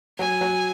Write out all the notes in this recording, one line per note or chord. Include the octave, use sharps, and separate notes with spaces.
F#3 G#5
F#3